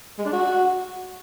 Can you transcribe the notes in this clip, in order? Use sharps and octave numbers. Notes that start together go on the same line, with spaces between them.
G#3
D4
F#4